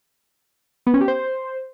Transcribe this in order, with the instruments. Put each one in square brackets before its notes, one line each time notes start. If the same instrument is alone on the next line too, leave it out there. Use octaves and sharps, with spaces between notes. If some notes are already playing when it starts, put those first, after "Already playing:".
[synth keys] B3
C#4
G4
C5